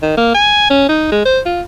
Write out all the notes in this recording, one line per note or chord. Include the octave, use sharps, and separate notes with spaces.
D#3
A#3
G#5
C#4
D#4
G#3
C5
F4